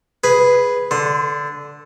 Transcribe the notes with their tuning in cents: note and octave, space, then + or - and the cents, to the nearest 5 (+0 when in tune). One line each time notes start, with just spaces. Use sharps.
G#4 +0 B4 +0
D3 -10 C6 +0